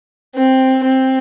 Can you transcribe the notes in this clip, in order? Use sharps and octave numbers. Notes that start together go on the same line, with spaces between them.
C4
C4